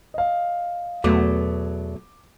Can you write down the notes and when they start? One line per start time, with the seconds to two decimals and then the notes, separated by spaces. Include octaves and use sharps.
0.14 D#5 F5
1.04 E2 B2 F#3 A3 D6